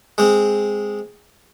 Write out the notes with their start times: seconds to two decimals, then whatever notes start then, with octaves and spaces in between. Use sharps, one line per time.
0.18 G#3 C4